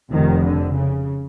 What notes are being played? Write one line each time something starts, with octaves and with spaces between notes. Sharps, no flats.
F1 F2 C3 D#3
D3
C#3